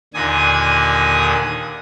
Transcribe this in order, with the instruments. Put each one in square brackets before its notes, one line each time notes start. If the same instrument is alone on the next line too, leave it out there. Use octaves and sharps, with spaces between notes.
[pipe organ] D#2 A#2 D3 G#5 D#6